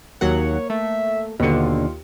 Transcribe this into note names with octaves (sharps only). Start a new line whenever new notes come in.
D#2 F#3 A#3 C#5 F#5
A3 E5
D#2 B2 D3 F4 C#7